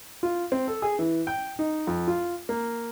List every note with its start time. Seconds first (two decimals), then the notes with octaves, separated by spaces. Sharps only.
0.23 F4
0.52 C4
0.67 A4
0.82 G#4
0.99 E3
1.27 G5
1.59 D#4
1.87 F2
2.08 F4
2.49 A#3